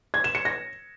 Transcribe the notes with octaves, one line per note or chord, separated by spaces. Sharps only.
G#6
E7
C#7
A#6